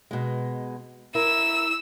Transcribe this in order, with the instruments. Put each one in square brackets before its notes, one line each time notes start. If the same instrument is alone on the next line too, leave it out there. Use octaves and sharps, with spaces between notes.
[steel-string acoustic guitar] B2 G#3
[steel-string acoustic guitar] E4 A#4 [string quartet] E6